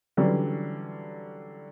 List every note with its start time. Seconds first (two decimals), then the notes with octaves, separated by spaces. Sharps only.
0.17 D3 E3 F#3 G3 C#4 D4